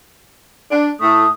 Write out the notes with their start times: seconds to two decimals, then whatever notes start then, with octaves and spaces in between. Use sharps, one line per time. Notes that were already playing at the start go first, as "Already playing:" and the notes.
0.70 D4
1.00 A2 A3 D#6